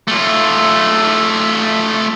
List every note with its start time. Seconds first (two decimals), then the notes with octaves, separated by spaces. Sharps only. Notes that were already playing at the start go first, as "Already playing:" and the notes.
0.08 A3 F4